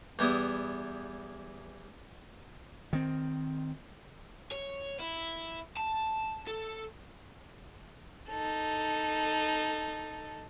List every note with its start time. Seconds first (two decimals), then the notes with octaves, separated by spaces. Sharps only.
0.19 E2 G3 B3 E4 D#6
2.93 D#3 C4
4.52 C#5
5.00 E4
5.77 A5
6.47 A4
8.29 D#4 A4